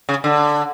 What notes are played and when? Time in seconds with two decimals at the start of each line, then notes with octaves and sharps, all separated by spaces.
0.09 C#3
0.24 D3